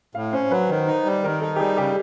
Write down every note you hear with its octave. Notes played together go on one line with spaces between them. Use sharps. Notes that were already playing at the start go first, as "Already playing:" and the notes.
A2 F5
C#4 C5
F#3 B4
D#3
D#4
G3
D#3 A#4
D#4 A4
G4
G3 G#4
C#3 G4